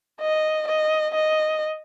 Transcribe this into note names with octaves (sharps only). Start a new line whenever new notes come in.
D#5
D#5
D#5